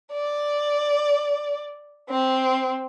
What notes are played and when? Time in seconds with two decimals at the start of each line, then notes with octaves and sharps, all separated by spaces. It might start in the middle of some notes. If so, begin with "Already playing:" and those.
0.12 D5
2.09 C4